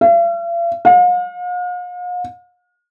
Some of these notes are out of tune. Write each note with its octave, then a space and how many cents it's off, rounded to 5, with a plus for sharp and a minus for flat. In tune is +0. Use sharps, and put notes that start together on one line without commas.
F5 -45
F5 +45